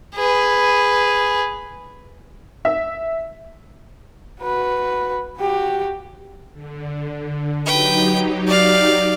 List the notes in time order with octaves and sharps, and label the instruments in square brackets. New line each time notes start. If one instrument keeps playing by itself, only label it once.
[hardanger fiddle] G#4 B4
[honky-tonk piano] E5
[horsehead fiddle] F#4 B4
F#4 G4
[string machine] D3
[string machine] F#3 D#4 G4 [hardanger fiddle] B4 G5
[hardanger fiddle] D5 F5